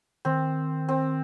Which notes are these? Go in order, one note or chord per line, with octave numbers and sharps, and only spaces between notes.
D#3 C4
C4